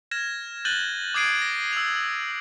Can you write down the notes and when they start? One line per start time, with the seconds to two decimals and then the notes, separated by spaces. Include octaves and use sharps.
0.11 F6 G#6 A#6 E7
0.65 F#6 G6 A6 D#7 F#7 G7
1.14 D6 D#6 G#6 C7 D7 D#7
1.42 A#6
1.73 E6 F7